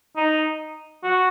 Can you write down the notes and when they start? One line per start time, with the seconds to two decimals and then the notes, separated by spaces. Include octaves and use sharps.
0.16 D#4
1.04 F#4